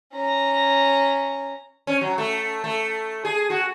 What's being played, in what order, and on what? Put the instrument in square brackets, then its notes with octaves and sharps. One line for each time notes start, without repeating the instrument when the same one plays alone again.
[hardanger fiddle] C#4 A#5
[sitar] C#4
F#3
A3
A3
G#4
F#4